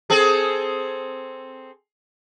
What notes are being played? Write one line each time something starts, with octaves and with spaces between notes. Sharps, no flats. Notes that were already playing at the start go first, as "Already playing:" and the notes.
C4 G#4 A4